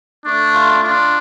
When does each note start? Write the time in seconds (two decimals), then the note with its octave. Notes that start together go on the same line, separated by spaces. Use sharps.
0.25 A3 D4
0.54 F4
0.83 D4 F4